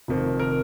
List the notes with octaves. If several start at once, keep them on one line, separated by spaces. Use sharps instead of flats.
F1 F2 D#3
A#4